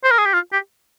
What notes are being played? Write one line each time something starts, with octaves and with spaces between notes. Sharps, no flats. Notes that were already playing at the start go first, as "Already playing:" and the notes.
C5
A#4
G#4
G4
F4
G4